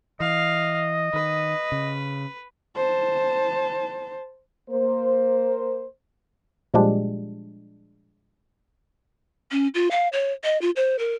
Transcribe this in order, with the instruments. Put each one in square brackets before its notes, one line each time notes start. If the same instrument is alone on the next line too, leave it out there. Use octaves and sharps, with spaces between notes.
[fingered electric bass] E3 [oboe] D#5 [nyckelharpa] F5
[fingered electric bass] D#3 [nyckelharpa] B4
[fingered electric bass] C#3
[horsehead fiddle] C5 A5
[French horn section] A#3 C5
[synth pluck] A#2 F3 G3 G#3 D4 G4
[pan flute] C#4
F4
F5
C#5
D#5
F4
C5
A#4